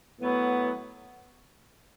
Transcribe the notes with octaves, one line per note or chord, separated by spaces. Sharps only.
A2 F#3 B3 E4